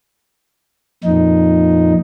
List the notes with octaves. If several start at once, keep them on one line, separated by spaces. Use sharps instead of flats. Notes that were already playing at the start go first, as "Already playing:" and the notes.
F2 A#2 D#4